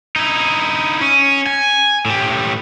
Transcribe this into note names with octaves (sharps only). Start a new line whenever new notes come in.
D#4 E4
C#4
G#5
A2 G4